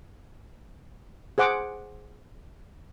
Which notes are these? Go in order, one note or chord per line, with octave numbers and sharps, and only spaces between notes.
G#4 C5 F#5 D6